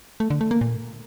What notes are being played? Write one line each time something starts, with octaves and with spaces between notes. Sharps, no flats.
A3
D3
A3
A#3
A#2